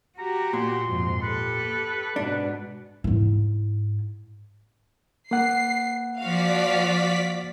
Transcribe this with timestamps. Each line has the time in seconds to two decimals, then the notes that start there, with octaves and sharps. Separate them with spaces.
0.18 F#4 G4 A#5
0.53 A#2 C6
0.88 F2 G#2
1.23 G4 A4 B4
2.16 G#2 B2 D4
3.04 G#2 E4
5.31 A#3 F#5 C7
6.21 F3 F#4 D5 F5 B6